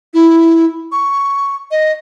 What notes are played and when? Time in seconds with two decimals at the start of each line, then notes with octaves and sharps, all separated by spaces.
0.14 E4
0.92 C#6
1.71 D#5